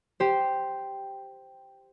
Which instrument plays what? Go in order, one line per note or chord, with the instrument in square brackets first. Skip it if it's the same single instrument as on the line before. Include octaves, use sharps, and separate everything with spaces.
[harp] G4 C5